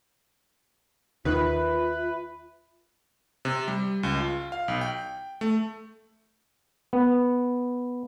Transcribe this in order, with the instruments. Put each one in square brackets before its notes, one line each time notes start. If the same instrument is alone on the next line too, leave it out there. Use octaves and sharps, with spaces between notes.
[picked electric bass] D#2 D#3 [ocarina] F4 [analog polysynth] B4 [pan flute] E5
[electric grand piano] C3
G3
C#2
F4
F5
B1
G5
A3
[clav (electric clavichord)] B3